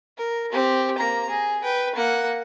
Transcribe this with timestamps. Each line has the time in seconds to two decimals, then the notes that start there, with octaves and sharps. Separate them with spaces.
0.18 A#4
0.52 C4 G4
0.98 A#3 A#5
1.30 G#4
1.64 B4 G5
1.95 A#3 F#5